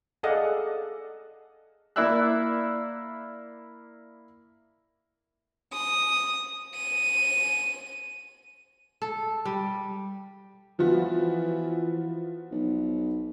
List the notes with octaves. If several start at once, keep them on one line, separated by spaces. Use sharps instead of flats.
G#4 A4 D5 D#5 F5 F#5
A#3 E4 D5 E5 E6 F#6
D#6
D#7
A4
G3
E3 F3 B3 F#4
B1